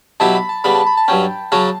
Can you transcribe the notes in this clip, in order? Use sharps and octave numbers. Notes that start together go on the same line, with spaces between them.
B2 F#3 B3 E4 G4 A5
B5
A5
C#3 G3 B3 B5
A5
B5
A5
G2 F#3 C#4 G5
C#3 F#3 C#4 F#4 A5